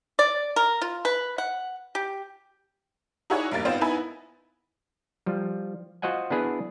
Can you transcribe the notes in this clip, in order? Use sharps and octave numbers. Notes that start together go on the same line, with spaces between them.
D5
A#4
F4
B4
F#5
G4
D#4 E4 F#4 G#4 C#5 D5
A#1 E2 G2 A#3 A6
G#1 B3 C4 F4 C5
B3 D#4 E4 B4 G#5
F3 G3
F4 F#4 C5 D#5 F#5 G#5
B3 D4 E4 G#4 B4